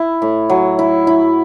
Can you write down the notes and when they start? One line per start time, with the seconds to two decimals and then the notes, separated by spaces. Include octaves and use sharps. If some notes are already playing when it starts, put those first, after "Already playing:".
Already playing: E4
0.22 A2
0.50 F#3
0.79 E4
1.07 E4